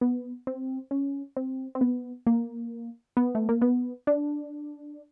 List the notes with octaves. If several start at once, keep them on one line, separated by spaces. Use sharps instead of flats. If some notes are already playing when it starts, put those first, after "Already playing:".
B3
C4
C#4
C4
C4
B3
A#3
B3
A3
A#3
B3
D4